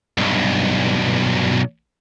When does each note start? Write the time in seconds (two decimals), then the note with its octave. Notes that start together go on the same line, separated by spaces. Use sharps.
0.18 B1 G2